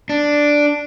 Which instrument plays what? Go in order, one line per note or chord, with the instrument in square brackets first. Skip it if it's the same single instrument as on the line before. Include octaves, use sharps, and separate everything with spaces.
[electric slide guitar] D4